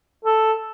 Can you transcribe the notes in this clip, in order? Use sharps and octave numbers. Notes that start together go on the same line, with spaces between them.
A4